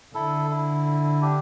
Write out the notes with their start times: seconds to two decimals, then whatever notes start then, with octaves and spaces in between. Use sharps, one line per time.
0.15 D3 E4 A4
0.51 E4
1.22 D4 G4